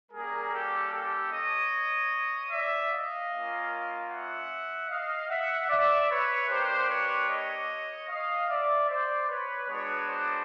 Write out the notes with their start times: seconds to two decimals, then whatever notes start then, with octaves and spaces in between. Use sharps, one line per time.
0.12 G3 A#3 C#4 G#4 A#4
0.51 G4 A4
0.92 G4 A4
1.31 C#5 D#5
2.51 D5 E5
2.91 D#5 F5
3.30 A#3 C#4 F4
4.10 E5 F#5
4.90 D#5 F5
5.30 E5 F#5
5.69 D5 E5
6.10 B4 C#5
6.49 A#3 D4 G4 A#4 C5
6.89 B4 C#5
7.29 C#5 D#5
8.09 D#5 F5
8.48 D5 E5
8.89 C5 D5
9.28 B4 C#5
9.68 G#3 B3 D4 F#4 B4 C#5
10.08 C5 D5